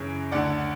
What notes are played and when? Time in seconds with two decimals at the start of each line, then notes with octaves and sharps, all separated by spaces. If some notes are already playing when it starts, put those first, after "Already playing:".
Already playing: F#2 C#3 E3 C#5
0.32 D2 D3 D5 F#5